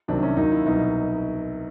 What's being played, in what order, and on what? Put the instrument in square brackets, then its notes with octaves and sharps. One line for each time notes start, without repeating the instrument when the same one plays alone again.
[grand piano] C2 C3 D#3 F#3 D4
C#4
D#2 D#3 F#3 D#4
E4
C2 B2 F#3 D#4